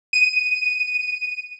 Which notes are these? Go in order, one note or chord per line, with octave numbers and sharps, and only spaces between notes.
D#7